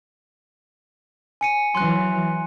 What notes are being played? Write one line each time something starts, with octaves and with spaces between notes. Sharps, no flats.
G#5 C#7 D#7
E3 F#3 C6 F#6